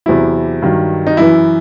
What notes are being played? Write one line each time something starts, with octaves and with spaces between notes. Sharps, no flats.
E2 C3 F#3 E4
G2 D#3 F#3
D#4
F#2 E3 E4